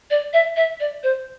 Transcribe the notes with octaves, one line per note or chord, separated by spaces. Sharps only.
D5
E5
E5
D5
C5